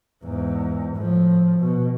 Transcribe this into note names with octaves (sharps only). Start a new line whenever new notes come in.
E2 G#2
A2 F3
B2